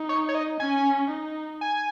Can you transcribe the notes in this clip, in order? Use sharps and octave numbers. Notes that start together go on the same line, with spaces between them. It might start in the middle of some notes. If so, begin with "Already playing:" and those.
Already playing: D#4
C#5
C#5
D#5
C#4 G#5
D#4
G#5